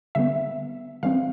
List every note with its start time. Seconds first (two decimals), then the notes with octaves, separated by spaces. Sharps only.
0.15 D3 G3 B3 E5
1.03 E3 G3 C4 F5